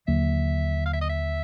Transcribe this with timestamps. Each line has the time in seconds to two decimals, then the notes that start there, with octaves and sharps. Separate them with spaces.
0.07 D#2 D3 F#3 A#3 E5
0.86 F5
0.93 E5
1.01 D#5
1.10 E5